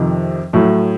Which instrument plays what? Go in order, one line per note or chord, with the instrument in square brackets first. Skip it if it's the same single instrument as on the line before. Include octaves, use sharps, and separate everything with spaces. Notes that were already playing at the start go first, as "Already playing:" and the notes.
Already playing: [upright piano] F2 C3 D#3
A2 F#3 A3